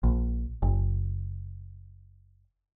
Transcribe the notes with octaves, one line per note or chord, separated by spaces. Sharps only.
A#1
F#1